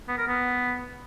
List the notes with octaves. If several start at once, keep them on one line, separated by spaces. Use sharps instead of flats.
B3
A#4
B3